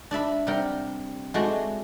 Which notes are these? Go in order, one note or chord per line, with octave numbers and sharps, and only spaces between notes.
D4 D5 E5 B5
C3 G3 A#4 F#5 G5
G#3 A3 F#4 C5 D5